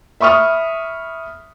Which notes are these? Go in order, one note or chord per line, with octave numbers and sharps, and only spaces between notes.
E5 B5 C#6 D#6 F6